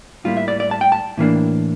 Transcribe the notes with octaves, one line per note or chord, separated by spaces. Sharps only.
A2 G3 A#3 E4 F4
E5
D5
D5
A5
G5
A5
A2 E3 A#3 D4